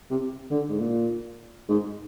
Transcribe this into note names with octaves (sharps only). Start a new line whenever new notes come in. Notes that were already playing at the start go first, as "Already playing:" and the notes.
C3
D3
G#2
A#2
G#2